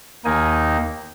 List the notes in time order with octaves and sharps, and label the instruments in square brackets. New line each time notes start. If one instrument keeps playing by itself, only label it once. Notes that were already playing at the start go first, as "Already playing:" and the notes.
[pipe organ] D#2 D#3 A#3 D#4 G#5